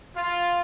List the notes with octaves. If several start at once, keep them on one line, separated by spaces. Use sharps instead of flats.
F4